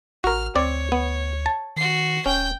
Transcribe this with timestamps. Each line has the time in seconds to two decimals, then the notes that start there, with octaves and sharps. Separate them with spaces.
0.24 A1 F#4 A#4 F6
0.55 D2 C4 C#5 D5
0.92 B3
1.46 A5
1.76 D#3 F#4 C7
2.26 D#1 C#4 G5 G6